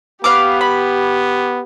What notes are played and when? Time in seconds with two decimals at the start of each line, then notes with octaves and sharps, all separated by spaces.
0.24 B3 G4 B4 F5 D6
0.61 B5